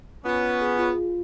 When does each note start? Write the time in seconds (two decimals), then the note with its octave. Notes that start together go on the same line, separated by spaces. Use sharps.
0.25 B3 C#4 F4
0.43 F4
0.61 G#4
0.79 F4
0.98 F4